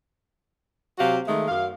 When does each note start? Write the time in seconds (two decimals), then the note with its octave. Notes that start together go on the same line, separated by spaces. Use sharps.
0.98 C3 F#3 F#4 G4 F5
1.27 D#3 G#3 A3
1.48 F#2 F5